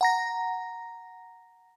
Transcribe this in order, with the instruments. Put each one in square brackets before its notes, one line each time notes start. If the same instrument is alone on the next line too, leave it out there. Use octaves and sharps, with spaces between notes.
[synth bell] F#5 A#5 A#6